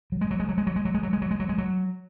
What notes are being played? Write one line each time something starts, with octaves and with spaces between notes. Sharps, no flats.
F#3
G#3
F#3
G#3
F#3
G#3
F#3
G#3
F#3
G#3
F#3
G#3
F#3
G#3
F#3
G#3
F#3